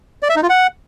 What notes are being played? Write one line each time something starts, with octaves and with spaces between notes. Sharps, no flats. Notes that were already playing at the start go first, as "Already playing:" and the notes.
D5
E5
D#4
F4
F#5